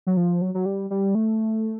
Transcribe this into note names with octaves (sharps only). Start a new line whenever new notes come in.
F#3
F3
F#3
F#3
G3
G3
A3